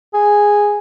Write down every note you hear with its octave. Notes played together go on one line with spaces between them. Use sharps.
G#4